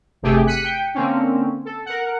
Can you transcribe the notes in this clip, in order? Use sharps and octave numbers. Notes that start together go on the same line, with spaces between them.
G1 C3 A3 G4 G#4
F#6 B6 C#7 D#7
G5
D3 A#3 C4 C#4
A4
A#4 F#5